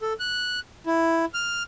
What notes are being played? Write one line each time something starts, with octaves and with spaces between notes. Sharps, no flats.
A4
F#6
E4
F6